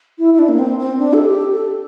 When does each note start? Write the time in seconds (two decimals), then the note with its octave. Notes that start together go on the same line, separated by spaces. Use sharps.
0.18 E4
0.34 E4
0.39 D4
0.49 A#3
0.59 C4
0.79 C4
0.99 D4
1.13 A4
1.25 G4
1.52 A4